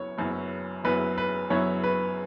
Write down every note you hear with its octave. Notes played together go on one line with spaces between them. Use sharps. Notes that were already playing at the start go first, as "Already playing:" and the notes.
Already playing: F#1 F#2 F#3 B3 E4 C#5
F#1 F#2 F#3 B3 E4
F#1 F#2 F#3 B3 E4 B4
B4
F#1 F#2 F#3 B3 E4 C#5
B4